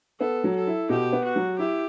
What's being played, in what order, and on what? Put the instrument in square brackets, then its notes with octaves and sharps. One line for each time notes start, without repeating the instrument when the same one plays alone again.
[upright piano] B3 [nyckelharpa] A4
[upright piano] F#3
[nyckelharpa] A4
[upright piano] E4
[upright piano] B2 [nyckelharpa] G4
[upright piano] B3
[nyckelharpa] F#4
[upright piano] F#3
[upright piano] E4 [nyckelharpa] G4